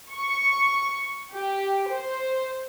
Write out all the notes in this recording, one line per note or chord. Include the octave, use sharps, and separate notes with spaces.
C#6
G4
C5